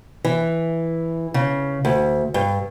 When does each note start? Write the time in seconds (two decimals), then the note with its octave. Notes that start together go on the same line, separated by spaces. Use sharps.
0.25 E3
1.34 C#3
1.85 D2
2.34 G2